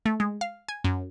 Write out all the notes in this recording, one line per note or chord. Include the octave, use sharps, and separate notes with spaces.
A3
G#3
F5
G#5
F#2